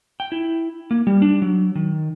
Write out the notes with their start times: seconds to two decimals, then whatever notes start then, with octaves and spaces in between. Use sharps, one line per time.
0.20 G5
0.32 E4
0.91 A#3
1.07 G3
1.22 D4
1.42 F#3
1.75 D#3